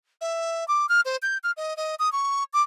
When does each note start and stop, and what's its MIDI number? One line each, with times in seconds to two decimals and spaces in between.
0.21 0.67 76
0.68 0.89 86
0.89 1.01 89
1.05 1.16 72
1.22 1.38 91
1.43 1.52 89
1.57 1.76 75
1.77 1.95 75
1.99 2.12 87
2.12 2.44 85
2.53 2.62 86